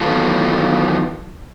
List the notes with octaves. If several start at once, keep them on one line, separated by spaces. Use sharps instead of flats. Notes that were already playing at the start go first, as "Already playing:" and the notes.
D#3 E3 F#3 B3 F4 A4